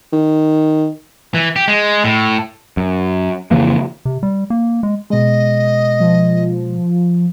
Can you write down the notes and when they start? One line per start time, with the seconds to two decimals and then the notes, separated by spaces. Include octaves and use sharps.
0.13 D#3
1.35 E3
1.56 G4
1.68 G#3
2.04 A2
2.77 F#2
3.51 F2 C#3 E3 A#3
4.05 C3
4.23 G3
4.50 A#3
4.83 G#3
5.10 B2 G#3 D#5
6.00 F3